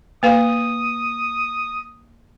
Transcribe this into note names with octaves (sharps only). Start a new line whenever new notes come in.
A#3 B4 F5 D#6